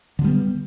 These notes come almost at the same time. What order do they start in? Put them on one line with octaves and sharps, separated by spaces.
D3 G#3 G3 B3